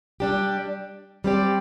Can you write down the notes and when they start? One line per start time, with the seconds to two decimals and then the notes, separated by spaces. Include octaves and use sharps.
0.20 G3 D4 G4
1.24 G3 C4 G4 D5